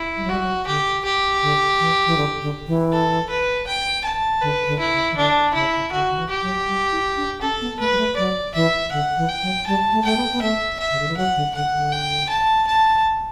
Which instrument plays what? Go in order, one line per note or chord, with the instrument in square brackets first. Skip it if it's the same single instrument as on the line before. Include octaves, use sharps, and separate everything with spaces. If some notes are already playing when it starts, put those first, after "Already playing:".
Already playing: [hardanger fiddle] E4
[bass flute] G3
F#3
[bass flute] G3 [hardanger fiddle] F#4
[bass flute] F#3
[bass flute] D3 [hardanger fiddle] G4
[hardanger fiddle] G4
[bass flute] D3
E3
E3
D3
D3
E3
[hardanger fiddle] A4
B4
G5
A5
[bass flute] D3 [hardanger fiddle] B4
[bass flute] D3
[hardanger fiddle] E4
[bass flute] C#3
E3
[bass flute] D3 [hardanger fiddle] D4
[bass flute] C#3 [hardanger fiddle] E4
[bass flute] C#3
[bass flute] D3 [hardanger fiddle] F#4
[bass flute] D3
E3
[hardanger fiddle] G4
[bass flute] F#3
G3
E4
D4
[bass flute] C#4 [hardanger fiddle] A4
[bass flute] B3
[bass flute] A3 [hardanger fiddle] B4
[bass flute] G3
A3
[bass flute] F#3 [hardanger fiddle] D5
[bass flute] E3 [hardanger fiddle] E5
[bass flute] D3 [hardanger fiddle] F#5
[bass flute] E3
[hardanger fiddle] G5
[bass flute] F#3
[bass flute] G3 [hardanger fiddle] A5
[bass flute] A3
[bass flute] A3 [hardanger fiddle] G5
[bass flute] B3
B3
[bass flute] A3 [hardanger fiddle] E5
[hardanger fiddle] E5
[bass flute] C#3
D3
E3
[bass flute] F#3 [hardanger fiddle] F#5
[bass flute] D3
[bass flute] D3 [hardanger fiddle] F#5
[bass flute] D3
[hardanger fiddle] G5
A5
A5